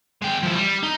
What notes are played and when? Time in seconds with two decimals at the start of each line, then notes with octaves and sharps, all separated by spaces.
0.22 G#3 G5
0.43 F3 E4
0.55 G3
0.83 D#4